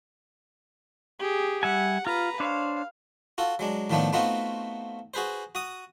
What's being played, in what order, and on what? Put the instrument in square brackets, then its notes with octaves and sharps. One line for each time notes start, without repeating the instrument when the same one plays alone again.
[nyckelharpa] G4 G#4
[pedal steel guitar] G3 E5 G#5 [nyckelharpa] F#5
[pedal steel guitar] F4 [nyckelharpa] B4 A#5
[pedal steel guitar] D4 C5 C#5 [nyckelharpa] F5
[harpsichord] F4 F#4 A4
F#3 G#3 D4
A2 D#3 F3 A3 B3 D4
A3 B3 C4 D#4 F4 F#4
F#4 G#4 B4 C5
F#4 D#6